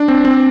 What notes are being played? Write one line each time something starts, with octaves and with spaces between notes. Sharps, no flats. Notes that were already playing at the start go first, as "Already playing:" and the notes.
Already playing: D4
C4
C4